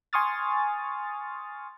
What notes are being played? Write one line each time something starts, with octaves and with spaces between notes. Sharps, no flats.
G#5 C6 C#6 D#6 F6 A6